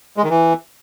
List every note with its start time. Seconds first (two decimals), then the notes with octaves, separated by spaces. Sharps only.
0.17 G#3
0.24 D#3
0.30 E3